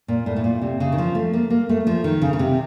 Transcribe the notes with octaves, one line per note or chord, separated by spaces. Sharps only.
A#2
A2
A2
A#2
C3
C#3
D#3
F3
A3
A#3
A#3
A3
F3
D#3
C#3
C#3
C3